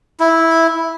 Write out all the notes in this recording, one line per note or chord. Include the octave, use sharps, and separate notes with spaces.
E4